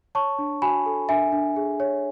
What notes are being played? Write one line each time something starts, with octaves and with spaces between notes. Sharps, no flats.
C#5 A5 C#6
D4
F#4 G#5 B5
A4
D4 E5 G#5
D4
G#4
C#5